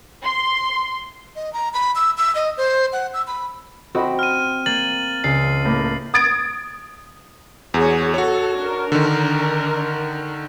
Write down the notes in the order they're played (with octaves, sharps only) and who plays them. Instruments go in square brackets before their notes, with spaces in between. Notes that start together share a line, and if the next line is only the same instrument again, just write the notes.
[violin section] C6
[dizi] D#5
A#5
B5
E6
E6
D#5
C5
F#5
E6
B5
[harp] C4 [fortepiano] F#4 D#5 B5
[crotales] F6 D#7
[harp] A#3 [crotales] A6 F#7
[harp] C#2 [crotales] C7
[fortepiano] A2 A#3
[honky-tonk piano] D#6 G#6 A6 D7
[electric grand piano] E2 [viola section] F#4 G#4 C#5
[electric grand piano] F#4 C#5 [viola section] A4
[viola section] D4 A#4
[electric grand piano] D3 D#3